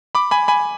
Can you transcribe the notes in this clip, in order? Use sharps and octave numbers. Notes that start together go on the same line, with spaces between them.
B5 D6
G#5 B5
G#5 B5